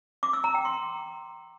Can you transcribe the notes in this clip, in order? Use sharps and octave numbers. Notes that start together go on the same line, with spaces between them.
D6
E6
A#5
G5
C6